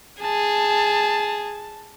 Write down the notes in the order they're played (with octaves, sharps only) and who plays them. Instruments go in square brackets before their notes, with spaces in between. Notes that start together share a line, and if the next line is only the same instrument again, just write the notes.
[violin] G#4 [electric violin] A5